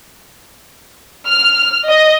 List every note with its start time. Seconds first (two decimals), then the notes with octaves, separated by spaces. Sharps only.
1.28 F6
1.87 D#5